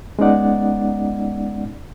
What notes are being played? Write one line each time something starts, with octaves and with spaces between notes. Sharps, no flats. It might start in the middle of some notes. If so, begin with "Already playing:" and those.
G#3 B3 C#4 D#4 D5 F#5